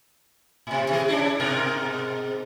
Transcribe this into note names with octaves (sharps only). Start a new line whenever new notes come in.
A2 C3
C3 E3 G#4
C#4 D4 E4
G#2 B2 A#4